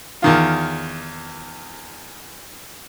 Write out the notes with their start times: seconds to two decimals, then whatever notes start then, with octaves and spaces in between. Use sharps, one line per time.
0.22 E2 D#3 F4